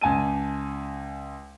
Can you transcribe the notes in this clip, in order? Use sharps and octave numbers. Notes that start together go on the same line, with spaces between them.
C#2 G#5 A5 D#7